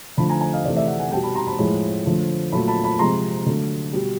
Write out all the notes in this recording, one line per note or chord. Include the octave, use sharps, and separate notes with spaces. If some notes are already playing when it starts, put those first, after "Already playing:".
D3 F3 A3 A5 B5
G#5 A#5
G#5 A#5
D#5 F5
C3 E3 A3 C5 D5
D5 E5
E5 F#5
F#5 G#5
B2 G3 G5 A5
A5 B5
A#5 C6
A5 B5
A2 F3 G#3
D3 F3 A3
A#2 F#3 A3 A5 B5
A5 B5
A5 B5
C3 F3 G#3 A#5 C6
D3 F#3 A3
B2 G3